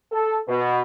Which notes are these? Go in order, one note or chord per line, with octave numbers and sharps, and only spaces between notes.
A4
B2